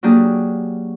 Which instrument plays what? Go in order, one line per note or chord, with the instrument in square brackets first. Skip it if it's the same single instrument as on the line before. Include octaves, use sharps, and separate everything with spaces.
[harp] F#3 A#3 D4 G4 G#4